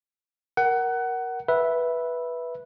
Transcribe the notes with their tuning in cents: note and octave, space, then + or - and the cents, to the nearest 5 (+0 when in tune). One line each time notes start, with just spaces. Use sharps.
A#4 +10 F#5 +20
B4 -10 E5 +0